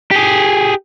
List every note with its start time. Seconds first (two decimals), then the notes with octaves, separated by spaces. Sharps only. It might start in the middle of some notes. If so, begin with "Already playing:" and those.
0.11 G4 G#4